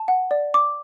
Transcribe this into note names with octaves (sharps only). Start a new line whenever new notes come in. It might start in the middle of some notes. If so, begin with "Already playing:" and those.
Already playing: A5
F#5
D5
D6